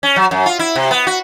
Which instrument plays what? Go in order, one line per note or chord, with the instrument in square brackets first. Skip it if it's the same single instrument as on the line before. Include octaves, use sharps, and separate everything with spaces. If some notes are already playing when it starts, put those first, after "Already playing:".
[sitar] C#4
F#3
F#2
F4
E4
C3
B3
F#4